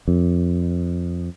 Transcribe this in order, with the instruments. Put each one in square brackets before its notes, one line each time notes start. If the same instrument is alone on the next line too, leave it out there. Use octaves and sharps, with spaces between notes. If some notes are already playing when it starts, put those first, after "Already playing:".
[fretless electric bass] F2